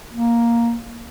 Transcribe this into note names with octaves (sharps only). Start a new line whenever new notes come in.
A#3